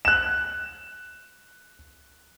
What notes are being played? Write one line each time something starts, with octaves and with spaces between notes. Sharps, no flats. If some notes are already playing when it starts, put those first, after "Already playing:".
F#6 E7